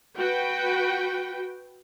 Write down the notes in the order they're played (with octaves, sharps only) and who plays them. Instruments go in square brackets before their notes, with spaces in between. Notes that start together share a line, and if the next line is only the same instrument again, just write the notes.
[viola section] F#4 B4 G5